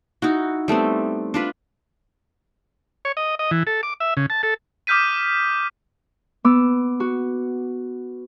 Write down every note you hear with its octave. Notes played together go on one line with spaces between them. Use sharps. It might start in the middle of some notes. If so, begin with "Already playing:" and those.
D#4 E4 F#4
G3 A3 B3 C4
D4 F4 B4
C#5
D#5
D#5
E3
A4
D6
E5
C#3
A5
A4
D6 D#6 F6 G6 B6 D#7
B3 D6 E6
F#4